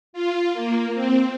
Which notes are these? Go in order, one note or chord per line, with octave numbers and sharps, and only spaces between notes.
F4
A#3
C4